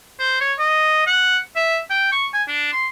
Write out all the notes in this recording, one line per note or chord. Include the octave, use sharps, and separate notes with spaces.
C5
C#5
D#5
F#5
E5
G5
C#6
G#5
D4
C6